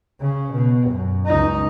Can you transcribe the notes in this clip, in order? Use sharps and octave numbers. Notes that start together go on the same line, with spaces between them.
C#3
B2
F#2
C#2 D#4